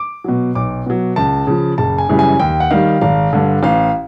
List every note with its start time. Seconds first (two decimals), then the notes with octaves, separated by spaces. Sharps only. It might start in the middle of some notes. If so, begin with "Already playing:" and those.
Already playing: D6
0.24 B2 F#3
0.55 B1 D6
0.86 B2 F#3
1.16 C#2 A5
1.47 C#3 F3
1.78 F#1 A5
1.98 G#5
2.09 F#2 C#3 E3 G3
2.19 G#5
2.40 D#2 G5
2.60 F#5
2.71 D#3 G3 F5
3.01 G#1 F5
3.33 G2 D3
3.63 A1 F5